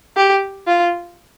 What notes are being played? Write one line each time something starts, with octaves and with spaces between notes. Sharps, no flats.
G4
F4